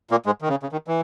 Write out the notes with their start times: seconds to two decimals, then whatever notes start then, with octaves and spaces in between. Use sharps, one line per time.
0.11 A#2 A#3
0.26 G#2 G#3
0.42 D#3
0.48 C#3
0.63 C#3
0.72 D#3
0.88 E3